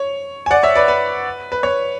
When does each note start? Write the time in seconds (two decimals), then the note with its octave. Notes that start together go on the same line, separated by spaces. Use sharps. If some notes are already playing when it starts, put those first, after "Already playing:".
Already playing: C#5
0.46 G#5
0.51 D5 F#5
0.63 C#5 E5
0.75 B4 D5
0.88 B4
1.52 B4
1.63 C#5